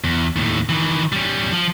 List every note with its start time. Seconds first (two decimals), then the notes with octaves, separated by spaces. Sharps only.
0.04 E2
0.36 D#2 A2
0.69 D#3 E3
1.13 G3 C#4
1.53 F3